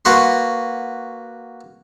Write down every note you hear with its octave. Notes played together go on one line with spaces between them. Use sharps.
A#3 F#4 B4 C6